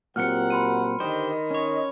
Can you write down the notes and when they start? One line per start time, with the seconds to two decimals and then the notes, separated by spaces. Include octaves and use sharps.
0.16 A#2 F#3 C4 G4 A#4 F#5 F6 C#7
0.50 B5 C6 D#7
1.00 D3 D#3 G4 C5 D#5
1.51 C#4 C#5